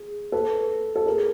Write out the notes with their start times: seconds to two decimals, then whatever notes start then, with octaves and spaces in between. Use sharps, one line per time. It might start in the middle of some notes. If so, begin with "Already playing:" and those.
Already playing: G#4
0.32 A4 B4
0.96 A4
1.06 G#4 A#4